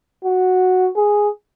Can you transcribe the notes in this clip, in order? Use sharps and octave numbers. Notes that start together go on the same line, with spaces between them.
F#4
G#4